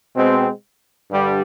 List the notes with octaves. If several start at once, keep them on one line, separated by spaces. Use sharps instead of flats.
B2 G#3 C4
G2 D3 G3